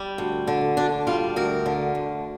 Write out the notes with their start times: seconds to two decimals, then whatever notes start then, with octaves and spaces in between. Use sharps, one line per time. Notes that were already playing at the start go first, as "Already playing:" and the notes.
Already playing: G3
0.18 D2
0.47 D3
0.77 D2 D4
1.07 G3 F4
1.36 D2 A#4
1.66 D3
1.95 D2